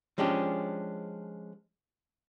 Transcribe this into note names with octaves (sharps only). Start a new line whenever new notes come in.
F3 G#3 C#4 D4 G4